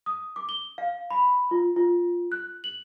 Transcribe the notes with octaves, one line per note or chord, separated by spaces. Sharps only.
D#6
D6
G7
F5
B5
F4
F4
F#6
F#7